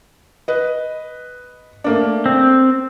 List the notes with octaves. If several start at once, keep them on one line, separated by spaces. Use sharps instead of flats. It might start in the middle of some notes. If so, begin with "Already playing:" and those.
B4 D#5
A3 A#3 D4
C4